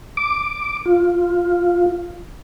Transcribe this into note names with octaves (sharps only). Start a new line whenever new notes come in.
D6
F4